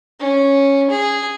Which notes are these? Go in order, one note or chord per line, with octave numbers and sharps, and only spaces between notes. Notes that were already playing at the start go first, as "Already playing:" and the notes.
C#4
G#4